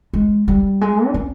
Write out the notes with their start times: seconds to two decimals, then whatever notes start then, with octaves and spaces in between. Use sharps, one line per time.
0.13 G#3
0.48 G3
0.81 G#3
1.08 D#4
1.14 C#4